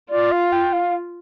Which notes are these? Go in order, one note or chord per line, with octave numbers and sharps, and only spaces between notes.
F4 D5
F5
G5
F5